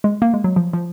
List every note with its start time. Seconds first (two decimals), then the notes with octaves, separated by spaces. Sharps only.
0.04 G#3
0.22 A#3
0.34 G#3
0.44 F#3
0.56 F3
0.73 F3